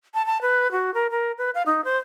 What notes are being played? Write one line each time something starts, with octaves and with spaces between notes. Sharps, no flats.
A5
A5
B4
F#4
A#4
A#4
B4
F5
D#4
C5